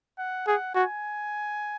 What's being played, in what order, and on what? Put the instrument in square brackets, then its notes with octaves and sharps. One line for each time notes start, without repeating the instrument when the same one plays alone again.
[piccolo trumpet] F#5
[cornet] G#4 [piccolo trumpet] F#5
[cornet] F#4 [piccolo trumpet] G#5